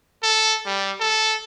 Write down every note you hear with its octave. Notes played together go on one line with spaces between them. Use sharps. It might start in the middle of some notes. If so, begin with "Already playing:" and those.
A4
G3
A4